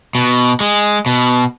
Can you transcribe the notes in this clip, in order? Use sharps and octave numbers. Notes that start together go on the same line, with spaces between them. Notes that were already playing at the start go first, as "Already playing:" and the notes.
B2
G#3
B2